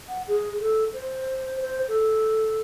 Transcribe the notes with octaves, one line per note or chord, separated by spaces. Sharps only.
F#5
G#4
A4
C5
C5
A4